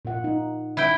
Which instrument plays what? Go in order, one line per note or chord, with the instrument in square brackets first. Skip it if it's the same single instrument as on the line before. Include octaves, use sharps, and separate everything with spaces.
[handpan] A#2 F4 F#5
D#4
[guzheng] E4 G5